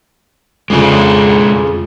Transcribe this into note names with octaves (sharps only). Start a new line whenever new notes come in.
F2 C#3 G#3 D4 G#4